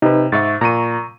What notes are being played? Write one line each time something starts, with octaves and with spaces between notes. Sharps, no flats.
C3 D#4 B4
G#2 E5 C#6 A6
A#2 A#5 C#6 D#7